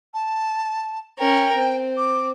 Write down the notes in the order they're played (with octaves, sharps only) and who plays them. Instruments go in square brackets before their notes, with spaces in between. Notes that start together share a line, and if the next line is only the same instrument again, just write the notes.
[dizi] A5
[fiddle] C#4 A#4 [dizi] G5
[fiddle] C4
[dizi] D6